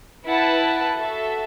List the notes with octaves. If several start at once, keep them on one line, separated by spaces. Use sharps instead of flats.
E4 B4 F#5 A5
F#4 A4 E5